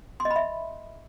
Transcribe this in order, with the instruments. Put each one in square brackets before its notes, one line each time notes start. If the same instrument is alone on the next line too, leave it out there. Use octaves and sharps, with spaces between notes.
[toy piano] C6
D#5
B5
E5